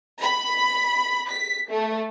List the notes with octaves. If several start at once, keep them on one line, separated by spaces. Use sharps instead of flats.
B5
B6
A3